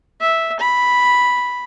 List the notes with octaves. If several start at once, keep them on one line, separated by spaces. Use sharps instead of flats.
E5
B5